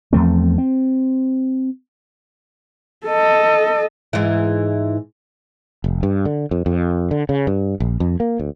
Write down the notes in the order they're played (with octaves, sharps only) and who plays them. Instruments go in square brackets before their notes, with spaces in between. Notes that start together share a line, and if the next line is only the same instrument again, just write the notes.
[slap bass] E2 F3 A3 C4
C4
[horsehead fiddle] A4 D#5
[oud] G#2 E3
[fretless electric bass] F1
G2
D3
F2
F2
D3
C#3
G2
A#1
F2
A#3
D2